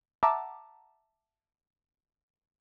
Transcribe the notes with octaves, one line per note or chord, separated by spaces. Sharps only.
E5 F#5 A5 A#5 D6